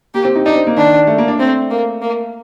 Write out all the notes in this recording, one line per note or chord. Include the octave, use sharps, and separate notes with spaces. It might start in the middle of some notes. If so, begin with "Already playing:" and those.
A#3 G4
C4
D#4
D4 D#4
C4
A#3
D#3 D4
A3
A#3
D4
A3 C4
A#3
A#3